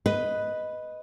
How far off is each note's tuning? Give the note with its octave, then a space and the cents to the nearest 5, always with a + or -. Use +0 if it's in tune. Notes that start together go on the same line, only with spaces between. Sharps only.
B4 +0 D#5 +0